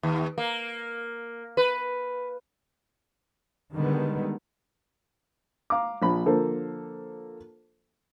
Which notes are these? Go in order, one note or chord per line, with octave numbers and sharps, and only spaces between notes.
D#2
A#3
B4
D3 D#3 G3 G#3 B3
F5 A#5 D6
A#1 F3 B5
D3 F3 A#3 A4 A#4 C5